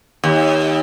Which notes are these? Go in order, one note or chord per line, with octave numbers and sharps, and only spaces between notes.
D#2